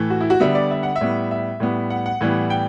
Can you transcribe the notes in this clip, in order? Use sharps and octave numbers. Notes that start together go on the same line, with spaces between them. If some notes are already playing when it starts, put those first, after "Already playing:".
Already playing: A2 E3 A3
F#4
E4
F#4
D3 G3 B3 E5
D5
E5
F#5
E5
A2 G3 B3
E5
A2 G3 B3
F#5
F#5
A2 E3 G3 B3
G5